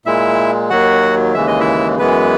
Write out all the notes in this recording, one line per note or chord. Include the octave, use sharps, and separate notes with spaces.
A#2 G#3 E4 E5
D#2 D#3 F#3 F#4 F#5
D#2 C#3 E3 G#3 E5
D#5
E4 E5
F#2 E3 G#3 B3 B4